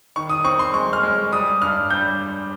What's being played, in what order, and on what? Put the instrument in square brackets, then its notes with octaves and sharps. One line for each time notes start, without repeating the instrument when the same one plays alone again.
[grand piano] D#3 C#6
D#6
C4 C#6
C6
G#3 C#6
F6
G#3
G3 D#6
G2 F6
G3 G6